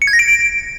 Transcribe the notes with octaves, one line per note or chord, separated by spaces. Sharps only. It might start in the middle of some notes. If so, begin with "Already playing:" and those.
C#7
G#6
A#6
D7